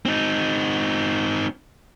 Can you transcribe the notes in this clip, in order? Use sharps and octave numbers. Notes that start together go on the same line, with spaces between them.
C4 D#4